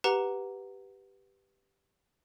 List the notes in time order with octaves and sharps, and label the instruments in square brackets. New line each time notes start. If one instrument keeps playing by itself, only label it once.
[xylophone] G4 B4 F#5 A#5